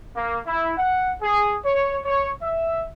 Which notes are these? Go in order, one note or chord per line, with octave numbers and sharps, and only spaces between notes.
A#3
E4
F#5
G#4
C#5
C#5
E5